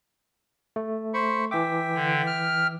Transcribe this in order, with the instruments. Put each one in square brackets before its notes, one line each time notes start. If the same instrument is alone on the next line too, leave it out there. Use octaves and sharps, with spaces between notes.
[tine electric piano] A3
[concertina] C5 B5 C#6
[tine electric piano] E3 D6 [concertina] E5 G5
[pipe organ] D3
F6